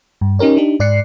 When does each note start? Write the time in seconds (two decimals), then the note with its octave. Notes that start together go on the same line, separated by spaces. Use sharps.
0.21 G2
0.39 C#4 D#4 G4 A#4 C#5
0.57 D4 D#4 G4
0.80 G#2 D5 F#6 C7 C#7